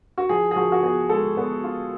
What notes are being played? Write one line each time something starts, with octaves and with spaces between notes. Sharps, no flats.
F#4
F3 G#4
G#4
F3 F#4
F#4
B3 G#4
G#3 A4
B3
F4